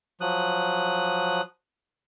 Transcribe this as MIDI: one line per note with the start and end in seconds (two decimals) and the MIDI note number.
0.21 1.41 53
0.21 1.41 54
0.21 1.41 87
0.21 1.41 90